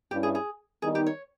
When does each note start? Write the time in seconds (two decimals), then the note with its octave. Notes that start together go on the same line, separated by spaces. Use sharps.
0.11 G2 G3 C#4 E4 G4
0.23 G#4
0.35 G#4
0.82 D#3 G3 B3 D#4 G#4
0.95 G4
1.06 C#5